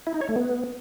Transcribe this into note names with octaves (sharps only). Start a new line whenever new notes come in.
E4
D#4
C#5
A3
B3